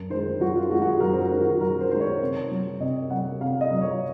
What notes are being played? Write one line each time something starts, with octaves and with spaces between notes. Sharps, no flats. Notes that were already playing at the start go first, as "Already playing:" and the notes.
Already playing: F#2
D#3 G#3 C5
F#2 F#4
F4
D#3 G#3 F#4
F#4
G#4
F#2 A#4
C5
A#4
D#3 G#3
F#4
F#2 A#4
C5
D#3 G#3 C5
C#5
C3
F#3
C3 D#5
F#3 F#5
C3 F5
D#5
F#3
C#5